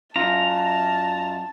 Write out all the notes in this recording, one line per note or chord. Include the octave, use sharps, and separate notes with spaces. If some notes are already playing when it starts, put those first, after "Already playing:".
F#2 F4 A5 A#5